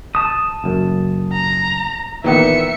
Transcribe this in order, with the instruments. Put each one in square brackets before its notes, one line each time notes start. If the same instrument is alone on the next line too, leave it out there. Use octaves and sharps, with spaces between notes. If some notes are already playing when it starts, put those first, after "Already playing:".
[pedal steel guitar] A5 D#6
[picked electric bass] F#1 F#2
[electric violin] A#5
[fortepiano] A#2 D#3 B3 [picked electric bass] E3 [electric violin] E5 C#7